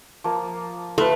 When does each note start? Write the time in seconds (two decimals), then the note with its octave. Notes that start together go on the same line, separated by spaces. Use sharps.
0.24 F3 A#3
0.98 A3 F4 B4